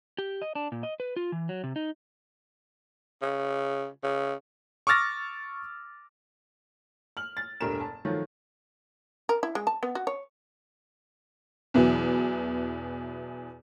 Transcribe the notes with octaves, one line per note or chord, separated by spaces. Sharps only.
G4
D#5
D4
A#2
D#5
B4
F4
E3
F#3
C3
D#4
C#3
C#3
C#6 D6 E6 F6 A6 A#6
F6 F#7
A6
E1 G2 A3 A#4 E7
A5
D#3 F3 F#3 A3
A#4
E4
G#3
A5
B3
F#4
C#5
E2 B2 E3 F#3